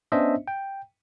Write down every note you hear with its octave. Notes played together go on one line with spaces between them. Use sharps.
B3 C#4 D4 C5 D#5 E5
G5